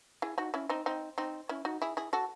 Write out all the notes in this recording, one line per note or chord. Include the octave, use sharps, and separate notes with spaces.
E4 G#4
D#4 F#4
C#4 E4
C4 D#4
C4 D#4
C4 D#4
C#4 E4
D#4 F#4
E4 G#4
E4 G#4
F#4 A4